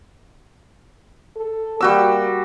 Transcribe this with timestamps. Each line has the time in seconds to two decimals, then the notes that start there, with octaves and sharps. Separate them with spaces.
1.36 A4
1.81 G3 A#3 F#4 E6